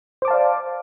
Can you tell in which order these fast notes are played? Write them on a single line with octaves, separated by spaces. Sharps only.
C5 D6 A5 F5 D5